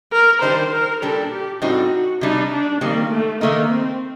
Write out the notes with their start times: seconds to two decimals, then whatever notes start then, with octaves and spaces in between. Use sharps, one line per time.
0.12 A#4
0.42 D#3 G3 D4 C5
0.72 A#4
1.02 A#2 G3 D4 A4
1.31 G4
1.62 A2 G3 C4 D#4 F#4
1.92 F#4
2.21 C3 G3 D4 D#4
2.51 D4
2.81 D#3 G3 A#3 C4
3.11 A3
3.41 D#3 A3 A#3 D#4
3.71 C4